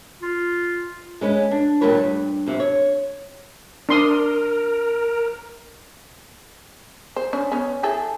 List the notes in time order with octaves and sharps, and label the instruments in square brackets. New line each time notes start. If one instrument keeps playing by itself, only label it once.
[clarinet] F4
[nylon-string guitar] G#3 C#4 B4
D4
D2 A#2 G3 A#4 B4 C#5
E2 G2
F2 C3
C#5
[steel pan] D4 C6 D#6 [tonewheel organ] A#4
[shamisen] C5
C#4 D4
B3 C#4
E4 G#4 A4